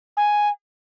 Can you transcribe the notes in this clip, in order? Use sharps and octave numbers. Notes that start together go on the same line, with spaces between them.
G#5